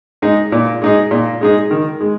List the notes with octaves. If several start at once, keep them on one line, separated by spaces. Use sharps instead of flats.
G#3 D#4 G#4
A#2
G#3 D#4 G#4
A#2
G#3 D#4 G#4
D#3
G#3